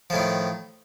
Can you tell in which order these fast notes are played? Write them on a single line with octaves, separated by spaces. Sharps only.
F3 A2 D#3